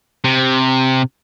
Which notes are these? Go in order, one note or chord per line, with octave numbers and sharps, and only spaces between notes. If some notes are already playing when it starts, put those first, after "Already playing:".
C3